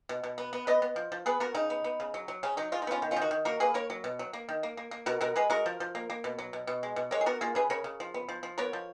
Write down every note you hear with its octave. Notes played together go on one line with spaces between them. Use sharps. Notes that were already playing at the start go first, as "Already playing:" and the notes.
B2
B2
B3
B3
B3 B4 D#5
B3
F3
F3
B3 G#4 B4
B3 F#4 A#4
C#3 D#4
B3
B3
C#3
F#3
F#3
C#3 C#4
F#3 D#4
G#3 F4
D#4
B3 C#4 F4
D#3
C#4 F4
D#3
D#4 F#4
D#3
A#3 F#4 A#4
A#3 G#4 B4
A#3 A#4 C#5
F#3
B2
F#3
A#3
D#3
A#3
A#3
A#3
B2 F#4 A#4
B2 F#4 A#4
G#3 G#4 B4
G#3 F#4 A#4
F3
F3
A#3
A#3
B2
F#3
B2
B2
G#3
B2
G#3 A#4 C#5
G#4
B3 F#4 A#4
A#3 F4 G#4
C#3 G#4 B4
C#3 A#4 C#5
C#3
F3
B3
F3
F3
B3 A#4 C#5
F3